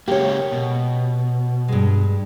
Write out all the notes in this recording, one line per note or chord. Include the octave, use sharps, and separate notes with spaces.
C#3 G#3 A#3 G4 C#5
B2
G2 G#3